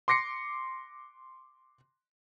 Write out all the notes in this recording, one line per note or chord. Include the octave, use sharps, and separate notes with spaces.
C6 D6 A#6 C7 C#7